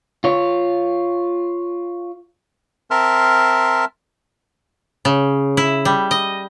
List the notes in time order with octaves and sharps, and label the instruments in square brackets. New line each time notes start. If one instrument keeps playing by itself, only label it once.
[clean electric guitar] F4 C#5
[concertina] C4 A#4 E5 A5 C6 F6
[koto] C#3
E4
G3
D#5